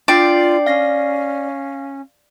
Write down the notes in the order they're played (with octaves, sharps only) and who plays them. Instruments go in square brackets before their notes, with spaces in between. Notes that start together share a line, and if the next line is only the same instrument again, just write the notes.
[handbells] D4 G5 C7 [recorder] F4 [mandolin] D5
[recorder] C#4 [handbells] F5 A#6